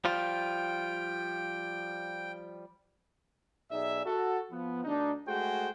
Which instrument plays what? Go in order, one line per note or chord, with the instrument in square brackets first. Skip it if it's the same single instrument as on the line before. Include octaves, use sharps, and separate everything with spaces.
[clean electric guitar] F3 G3 F4 [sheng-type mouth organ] G5
[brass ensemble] B1 D#4 G#4 D5 E5
F#4 A4
F3 B3
D2 D4 D#4
G#3 A3 F#4 G#4 C5 G5